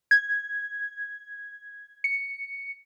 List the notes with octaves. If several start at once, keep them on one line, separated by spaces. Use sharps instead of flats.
G#6
C#7